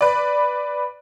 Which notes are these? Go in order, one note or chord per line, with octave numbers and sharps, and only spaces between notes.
B4 D5